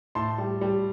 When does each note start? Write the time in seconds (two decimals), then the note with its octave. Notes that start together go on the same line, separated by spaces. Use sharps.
0.15 A2 A5 C6
0.38 G3
0.61 G3